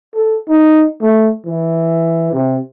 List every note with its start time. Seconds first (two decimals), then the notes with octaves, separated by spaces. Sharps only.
0.14 A4
0.48 D#4
1.01 A3
1.46 E3
2.32 C3